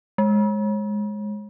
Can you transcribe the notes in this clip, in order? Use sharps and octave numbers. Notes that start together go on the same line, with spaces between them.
G#3